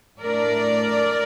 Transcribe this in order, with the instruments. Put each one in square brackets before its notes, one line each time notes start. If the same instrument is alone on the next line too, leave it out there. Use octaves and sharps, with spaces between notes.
[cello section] A2 A3 D4 A#4 D5